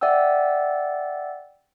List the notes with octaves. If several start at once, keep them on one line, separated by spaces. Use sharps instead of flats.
D5 E5 F#5 G5 E6